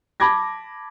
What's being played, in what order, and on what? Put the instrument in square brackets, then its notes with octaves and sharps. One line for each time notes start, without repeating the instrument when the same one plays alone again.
[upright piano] A5 B5 D6 G#6 A#6